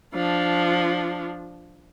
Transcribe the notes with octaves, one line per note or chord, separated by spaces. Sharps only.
F3 D4